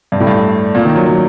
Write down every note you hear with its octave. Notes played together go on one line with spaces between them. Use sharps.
G2
A2
G2
A#2
D#3
F#3
F#3